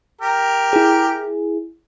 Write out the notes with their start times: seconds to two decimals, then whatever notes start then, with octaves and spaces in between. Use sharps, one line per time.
0.21 G4 A#4
0.73 E4 G#4